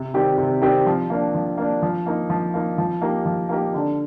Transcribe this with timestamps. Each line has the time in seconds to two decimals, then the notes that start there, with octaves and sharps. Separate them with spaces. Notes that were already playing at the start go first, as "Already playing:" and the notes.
Already playing: C3
0.14 D#3 G3 C4 G4
0.38 C3
0.62 D#3 G3 C4 G4
0.87 F3
1.10 A#3 D4
1.35 F3
1.58 A#3 D4
1.82 F3
2.06 A#3 D#4
2.30 F3
2.54 A#3 D#4
2.78 F3
3.02 A#3 D#4 G4 A#4
3.26 F3
3.49 A#3 D#4 G4 A#4
3.74 D3